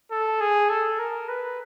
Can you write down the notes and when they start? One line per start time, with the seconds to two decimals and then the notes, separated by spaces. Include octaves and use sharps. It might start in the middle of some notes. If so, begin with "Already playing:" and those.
0.11 A4
0.41 G#4
0.70 A4
0.99 A#4
1.28 B4